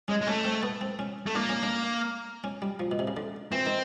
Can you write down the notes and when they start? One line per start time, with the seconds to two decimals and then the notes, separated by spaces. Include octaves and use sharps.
0.08 G#3 C#4
0.21 G#3
0.27 A3 C#4
0.45 C4
0.63 B3
0.81 C4
0.99 C#4
1.26 A3
1.35 A#3 D4
1.49 C#4
1.63 D4
2.44 C#4
2.62 G3
2.80 F3
2.91 B2
2.99 C3
3.08 C#3
3.17 D3
3.52 E3 C4
3.66 D#3